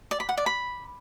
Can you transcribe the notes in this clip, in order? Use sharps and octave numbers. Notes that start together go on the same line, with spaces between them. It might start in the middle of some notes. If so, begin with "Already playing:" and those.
D5
B5
F#5
D5
B5